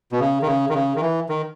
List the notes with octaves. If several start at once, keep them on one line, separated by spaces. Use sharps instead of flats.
B2
C#3
D#3
C#3
D#3
C#3
D#3
E3
D#3